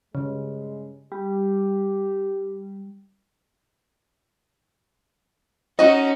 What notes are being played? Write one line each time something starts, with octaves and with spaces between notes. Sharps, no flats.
G2 C#3 G#3
G3 G4
C#4 D#4 F#4 D#5